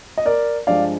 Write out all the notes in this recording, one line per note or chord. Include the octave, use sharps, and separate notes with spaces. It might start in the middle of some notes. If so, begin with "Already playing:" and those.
D#5
A#4 D5
G2 F3 G#3 D5 F5